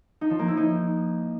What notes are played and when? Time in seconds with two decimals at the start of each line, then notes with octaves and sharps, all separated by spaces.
0.21 D#4
0.30 F3
0.39 A#3
0.48 E4
0.57 D#4